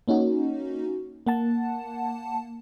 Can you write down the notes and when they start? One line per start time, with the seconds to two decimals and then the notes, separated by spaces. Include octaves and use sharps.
0.08 A#3 C#4 D#4 F#4
1.27 A#3 F#5 A5